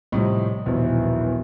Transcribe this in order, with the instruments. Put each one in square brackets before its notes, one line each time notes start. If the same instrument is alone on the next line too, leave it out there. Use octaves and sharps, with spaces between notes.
[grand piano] A2 C3 F3 [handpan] G3 C4 D#5
[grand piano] A#1 D#2 [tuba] B2 [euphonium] E3